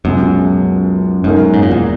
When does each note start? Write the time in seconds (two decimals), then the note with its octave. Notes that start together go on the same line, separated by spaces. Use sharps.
0.05 C#2 F#2 B2 G#3
1.24 F#2 B2 G#3 D#4 A#4
1.54 G#2
1.62 A#2
1.71 E2